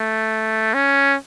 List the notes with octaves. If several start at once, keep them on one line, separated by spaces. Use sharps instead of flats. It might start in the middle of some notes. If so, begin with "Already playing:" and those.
Already playing: A3
C#4